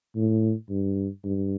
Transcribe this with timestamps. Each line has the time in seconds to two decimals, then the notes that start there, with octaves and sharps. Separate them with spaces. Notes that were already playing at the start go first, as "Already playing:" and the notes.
0.16 A2
0.70 G2
1.24 G2